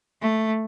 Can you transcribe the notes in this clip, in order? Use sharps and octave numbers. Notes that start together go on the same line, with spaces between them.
A3